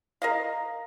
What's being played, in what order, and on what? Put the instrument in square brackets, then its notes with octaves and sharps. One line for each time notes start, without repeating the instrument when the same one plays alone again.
[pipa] A#4 D#5 F5